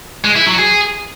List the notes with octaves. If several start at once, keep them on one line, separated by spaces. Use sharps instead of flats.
G#3
E4
F#3
G#4